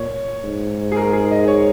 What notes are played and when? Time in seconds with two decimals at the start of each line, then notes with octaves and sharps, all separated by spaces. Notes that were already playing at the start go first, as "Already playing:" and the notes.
Already playing: A#2 C#5
0.44 G#2
0.92 G#4
0.96 A#4
1.13 G#4
1.31 D#5
1.48 C#5